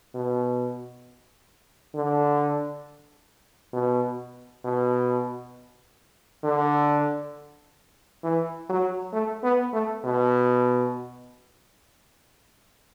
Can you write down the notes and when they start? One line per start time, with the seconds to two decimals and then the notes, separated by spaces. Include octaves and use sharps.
0.14 B2
1.95 D3
3.73 B2
4.64 B2
6.43 D3
8.23 E3
8.69 F#3
9.13 A3
9.43 B3
9.73 A3
10.04 B2